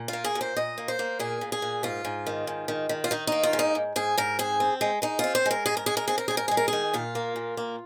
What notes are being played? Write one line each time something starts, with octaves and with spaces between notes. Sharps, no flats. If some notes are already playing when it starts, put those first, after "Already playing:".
Already playing: A#2
F4
A#3
G#4
A#2
C5
A#2 D#5
A#3
C5
A#3
A#2 G#4
A#2
G#4
A#2
G#2 F4
G#2
D#3
G#2
D#3
D#3
F4
D#3 D#4
A#3 D#4
F4
G#2
D#4
G#2
G#2 G#4
G#2 A#4
C4 G#4
C4
G#3
G#3 D#4
C4 F4
C5
G#3
A#4
G#2 G#4
A#4
G#3 G#4
A#4
C4 G#4
A#4
G#2 G#4
A#4
G#3 G#4
A#4
D#3 G#4
A#2 F4
A#3
A#2
A#3